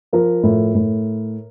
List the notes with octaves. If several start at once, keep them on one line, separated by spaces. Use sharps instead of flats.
F3 A#4
A2
A2